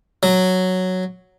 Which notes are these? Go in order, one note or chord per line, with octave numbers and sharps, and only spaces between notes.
F#3